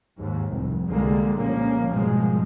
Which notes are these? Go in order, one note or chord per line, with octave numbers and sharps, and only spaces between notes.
D#2 G#2
F1 C2
C2 D3 G3 G#3 A#3
A#1 F3 A#3 C#4
G#2 B2 F3 G3 G#3